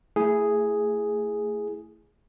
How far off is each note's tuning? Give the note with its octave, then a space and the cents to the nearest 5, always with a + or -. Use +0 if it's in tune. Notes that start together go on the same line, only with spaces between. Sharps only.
A3 +25 E4 +0 G#4 +0